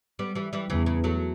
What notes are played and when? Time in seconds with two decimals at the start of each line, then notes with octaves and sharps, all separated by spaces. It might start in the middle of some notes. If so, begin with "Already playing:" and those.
0.19 G3 B3
0.35 E3 G3
0.53 E3 G3
0.70 E2 C#3 E3
0.86 C#3
1.04 F#3 A3